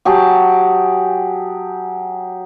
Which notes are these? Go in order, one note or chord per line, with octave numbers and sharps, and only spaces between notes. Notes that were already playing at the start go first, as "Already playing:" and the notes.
F#3 G4 G#4 A5